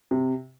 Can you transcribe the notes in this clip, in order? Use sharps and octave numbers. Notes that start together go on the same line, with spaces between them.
C3